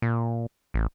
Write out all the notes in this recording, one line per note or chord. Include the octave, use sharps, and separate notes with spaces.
A#2
A1